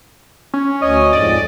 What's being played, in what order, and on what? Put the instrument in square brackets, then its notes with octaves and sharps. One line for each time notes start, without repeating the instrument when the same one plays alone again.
[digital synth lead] C#4
[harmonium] D2 C#5 G#5 [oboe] D#5
[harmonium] F2 G#2 [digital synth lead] D5